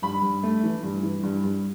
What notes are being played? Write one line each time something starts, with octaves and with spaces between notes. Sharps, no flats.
G2 B5
G2
A3
E3
G2
E3
G2
G2